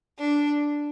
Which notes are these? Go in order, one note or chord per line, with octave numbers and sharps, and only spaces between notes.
D4